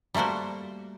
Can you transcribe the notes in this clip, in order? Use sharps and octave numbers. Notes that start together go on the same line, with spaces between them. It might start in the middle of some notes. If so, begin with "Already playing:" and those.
G3 A3 A#3 F#4 C5